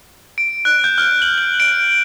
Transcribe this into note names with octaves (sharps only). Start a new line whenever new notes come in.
D7
F#6
G6
F6
F#7
F#7
D7